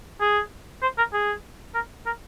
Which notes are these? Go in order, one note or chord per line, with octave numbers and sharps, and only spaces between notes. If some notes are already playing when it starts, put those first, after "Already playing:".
G#4
C5
A#4
G#4
A#4
A#4